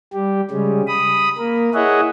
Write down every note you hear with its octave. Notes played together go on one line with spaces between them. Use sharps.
G3 G4
C#3 G3 G#3 C#4
B5 D#6
A#3 A#4
E4 G#4 C#5 D#5 E5 F#5